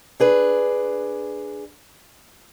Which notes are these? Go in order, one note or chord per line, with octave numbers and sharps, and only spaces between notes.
D4 G#4 B4